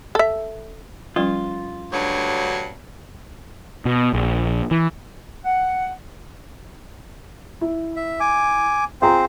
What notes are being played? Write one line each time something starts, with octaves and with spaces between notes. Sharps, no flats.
A4 E5
F3 G3 C#4 F4
D2 G2 F#3
B2
A#1
E3
F#5
E4
E5
G#5 D6
C4 F4 G#4 C5 A#5